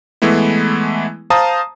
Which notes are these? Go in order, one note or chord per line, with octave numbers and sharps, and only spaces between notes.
E3 G#3 A3 B3 E4
C5 F5 A5 A#5 D#6